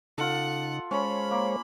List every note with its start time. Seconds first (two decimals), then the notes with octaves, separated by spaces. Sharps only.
0.18 C#3 D#4 F4 A4 F#5
0.91 G#3 C#4 C5 C#5 B5
1.31 A#3